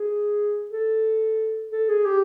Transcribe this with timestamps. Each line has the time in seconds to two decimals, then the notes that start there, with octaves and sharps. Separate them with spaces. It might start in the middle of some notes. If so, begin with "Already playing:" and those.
Already playing: G#4
0.71 A4
1.71 A4
1.89 G#4
2.05 G4